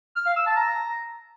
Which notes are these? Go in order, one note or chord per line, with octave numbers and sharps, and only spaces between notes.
F6
F5
E6
A5
A#5